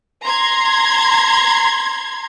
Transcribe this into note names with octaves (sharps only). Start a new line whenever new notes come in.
A#5 C6 G#6